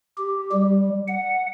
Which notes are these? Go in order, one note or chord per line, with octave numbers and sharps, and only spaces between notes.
G4
G3
F#5